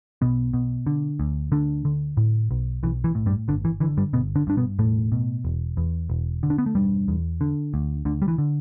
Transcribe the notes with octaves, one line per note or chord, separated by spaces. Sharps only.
B1 B2 B3
B2
D3
D2
D2 D3 D4
D3
A2
B1
B1 E3
E3
A2
G2 G3
G1 D3
E3
D3 E3
G2 G3
G1 B2 B3
D3 D4
G2 D4
B2 B3
E1 A2 A3
B2
E1
E2
E1
D3
D4
B3
A3
E1 G2 G3
E2
D3
D2
D2 D3
G3
E3
D3